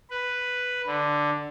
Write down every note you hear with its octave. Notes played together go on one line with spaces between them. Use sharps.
B4
D3